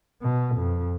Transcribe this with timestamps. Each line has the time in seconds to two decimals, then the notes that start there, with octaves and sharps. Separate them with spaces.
0.22 B2
0.56 F2